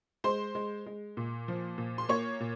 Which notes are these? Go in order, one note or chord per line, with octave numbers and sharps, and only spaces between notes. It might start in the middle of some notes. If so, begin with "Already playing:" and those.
G#3 C5 C6
G#3
G#3
A#2
F3
A#2
C6
A#3 C#5 C#6
A#2